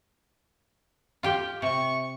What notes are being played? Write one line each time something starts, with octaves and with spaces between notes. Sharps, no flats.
F4 G4 G5
C3 C#6